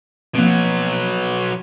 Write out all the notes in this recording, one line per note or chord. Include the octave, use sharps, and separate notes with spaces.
B2 F3 F#3 A#3 C4